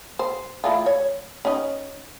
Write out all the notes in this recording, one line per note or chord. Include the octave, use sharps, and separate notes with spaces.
C5
E3 A3 F4
C#5
C#4 D#4